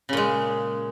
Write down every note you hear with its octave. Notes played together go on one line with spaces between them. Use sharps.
A#2 C#3 G#3